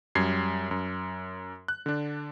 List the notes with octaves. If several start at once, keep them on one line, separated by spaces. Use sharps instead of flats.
F#2 G3 G#6 C7
F#2
F#6
D3 D4